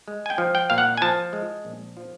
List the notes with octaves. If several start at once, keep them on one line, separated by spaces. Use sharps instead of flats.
G#3
G#5
G5
F3
G5
A#2 F5
F#5
G#5
F3 A5
G#3
A#1
F3